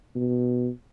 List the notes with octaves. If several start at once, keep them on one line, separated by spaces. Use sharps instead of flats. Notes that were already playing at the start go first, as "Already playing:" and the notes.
B2